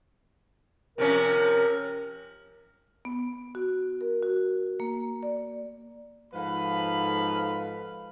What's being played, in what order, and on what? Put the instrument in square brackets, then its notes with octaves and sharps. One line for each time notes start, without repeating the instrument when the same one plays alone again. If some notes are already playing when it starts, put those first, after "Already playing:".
[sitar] C3 F3 C#4 [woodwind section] A#4
[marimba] B3
F#4
A#4
F#4
A#3
D5
[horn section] G#2 F3 A4 B4 F5 B5